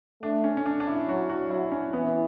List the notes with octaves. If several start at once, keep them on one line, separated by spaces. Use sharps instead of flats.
A3 D4
C#4
C#4
D4
D4
E4
F#3 F#4
F#4
F#3 E4
C#4
E3 B3